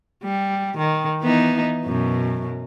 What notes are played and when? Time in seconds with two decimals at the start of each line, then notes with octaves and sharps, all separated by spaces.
0.24 G3
0.78 D#3
1.22 E3 B3 D#4
1.86 F#2 B2